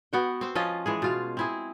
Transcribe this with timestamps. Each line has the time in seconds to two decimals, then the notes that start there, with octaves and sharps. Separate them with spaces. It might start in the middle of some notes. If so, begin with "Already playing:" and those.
0.13 B3 F#4 G5
0.41 C4 C5
0.55 F3 C#4 F4 D#5
0.86 E3 G#3 G#4
1.02 B2 F4 F5
1.37 C4 E4 G#4